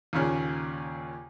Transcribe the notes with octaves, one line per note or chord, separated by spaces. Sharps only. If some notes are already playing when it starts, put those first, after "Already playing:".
D#2 A#2 C#3